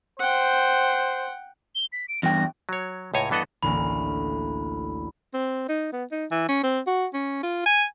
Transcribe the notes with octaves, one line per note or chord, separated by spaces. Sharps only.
C5 F#5 G5
G7
B6
D7
E2 G2 G5 A#6
F#3 C#5
C#2 A2 C#5 G#5 A#5
G2 E3 B3 A4 D#5 F#5
A1 D2 A#3 B5
C4
D#4
B3
D#4
E3
C#4
C4
F#4
C#4
F4
G#5